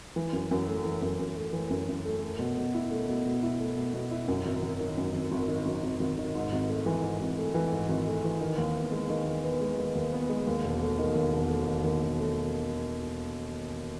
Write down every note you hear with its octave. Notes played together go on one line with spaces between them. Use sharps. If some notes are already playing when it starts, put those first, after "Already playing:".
E3
F#2
F#2
A3
E3
F#2
F#2
A3
E3
F#2
F#2
A3
A3
B2
B2
E4
A3
B2
B2
E4
A3
B2
B2
E4
F#2
G#1
G#1
D#3
F#2
G#1
G#1
D#3
F#2
G#1
G#1
D#3
G#2
G#1
A3
E3
G#2
G#1
A3
E3
G#2
G#1
A3
E3
D#3
D#2
B3
G#3
D#3
D#2
B3
G#3
D#3
D#2
B3
G#3
D#2
E1
A3
D#3
D#2
E1
A3
D#3
D#2
E1
A3